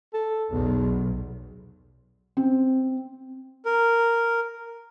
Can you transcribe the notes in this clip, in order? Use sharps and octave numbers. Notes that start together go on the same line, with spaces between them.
A4
B1 E2
C4
A#4